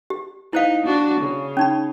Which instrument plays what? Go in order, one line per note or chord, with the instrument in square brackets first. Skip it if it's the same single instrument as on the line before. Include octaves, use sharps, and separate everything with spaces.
[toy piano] G4
[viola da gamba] D#4 [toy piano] E4 C5 F5
[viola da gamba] D4 F#4
C#3
[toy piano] C#4 D#4 B5